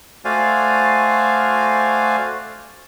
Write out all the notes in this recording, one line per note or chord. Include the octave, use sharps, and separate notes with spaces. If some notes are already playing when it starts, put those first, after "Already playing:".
A3 F#4 C5 D5 F5 G#5